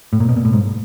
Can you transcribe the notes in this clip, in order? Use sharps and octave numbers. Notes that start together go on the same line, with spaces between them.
A2
A#2
B2
A#2
A2
G#2